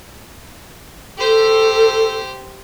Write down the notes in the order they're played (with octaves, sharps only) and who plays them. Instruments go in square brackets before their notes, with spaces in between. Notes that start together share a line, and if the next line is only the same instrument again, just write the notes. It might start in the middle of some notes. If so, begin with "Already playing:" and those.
[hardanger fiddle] G4 C5 [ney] A4